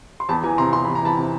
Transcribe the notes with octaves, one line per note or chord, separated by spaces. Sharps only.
C6
E2 A5 B5
E3 G#5 A#5
C3 A#5 C6
E2 C6
E2 B5
A#5
E3 A5 B5
C3